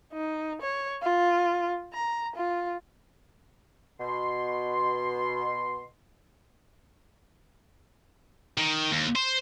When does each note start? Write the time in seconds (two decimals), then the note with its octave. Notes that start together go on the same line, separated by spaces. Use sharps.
0.13 D#4
0.62 C#5
1.02 F4
1.93 A#5
2.36 F4
4.00 B2 C6
8.58 D#3
8.91 D#2
9.16 C5